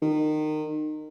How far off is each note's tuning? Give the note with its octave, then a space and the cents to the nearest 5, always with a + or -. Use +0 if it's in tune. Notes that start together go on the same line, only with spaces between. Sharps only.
D#3 -25